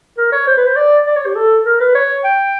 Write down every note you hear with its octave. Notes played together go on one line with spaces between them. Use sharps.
A#4
C#5
C5
B4
C5
D5
D5
C#5
G4
A4
A#4
B4
C#5
G5